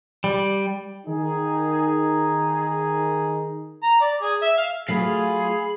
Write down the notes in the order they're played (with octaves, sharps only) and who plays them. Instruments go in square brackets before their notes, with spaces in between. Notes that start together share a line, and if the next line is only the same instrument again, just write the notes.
[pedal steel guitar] G3
[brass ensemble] D#3 D#4 G#4
[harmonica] A#5
D5
G#4
E5
F5
[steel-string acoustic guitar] F#3 A3 F4 [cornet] G#4 [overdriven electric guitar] F5 [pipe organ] B5